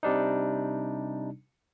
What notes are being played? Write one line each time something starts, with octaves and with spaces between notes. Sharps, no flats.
C3 G3 D4 D#4